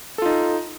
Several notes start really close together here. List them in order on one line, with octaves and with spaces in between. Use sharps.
A4 F4 D#4